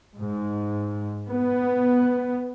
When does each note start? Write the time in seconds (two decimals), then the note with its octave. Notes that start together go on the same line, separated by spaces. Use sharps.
0.17 G#2
1.29 B3